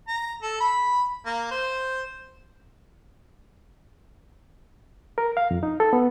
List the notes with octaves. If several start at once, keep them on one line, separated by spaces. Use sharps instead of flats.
A#5
A4
B5
A#3
C5
A#4
F5
F2
D#4
A4
B3